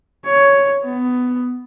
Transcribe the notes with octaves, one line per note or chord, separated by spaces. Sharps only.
C#5
B3